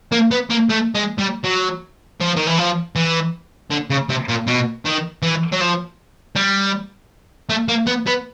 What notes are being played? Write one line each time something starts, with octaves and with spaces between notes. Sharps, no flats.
A#3
B3
A#3
A3
G#3
G3
F#3
F3
D#3
E3
F3
E3
D3
C#3
C3
A#2
B2
D#3
E3
F#3
F3
G3
A3
A#3
B3
B3